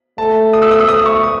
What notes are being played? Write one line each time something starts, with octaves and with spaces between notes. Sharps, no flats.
A3 A5
D#6
E6
D#6
E6
A3 D#6
C#6
D#6